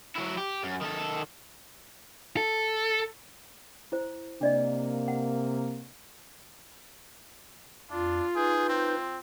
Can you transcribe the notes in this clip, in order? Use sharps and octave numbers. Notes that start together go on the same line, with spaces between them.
F#3 E4
G4
F#2
D#3 A4
A4
E4 C5
C3 A#3 D4 D5 D#5
F#5
F2 D4 F4
D#4 G#4 B4 G6
C4